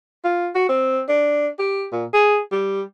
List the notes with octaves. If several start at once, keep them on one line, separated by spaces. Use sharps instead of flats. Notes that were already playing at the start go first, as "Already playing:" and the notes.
F4
F#4
C4
D4
G4
A#2
G#4
G3